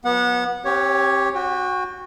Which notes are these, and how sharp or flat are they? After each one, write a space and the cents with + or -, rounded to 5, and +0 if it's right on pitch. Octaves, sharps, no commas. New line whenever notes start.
F3 +45 B3 -25 F#5 -20
C4 +45 G4 +0 C#5 +0
F#4 -10 G5 +30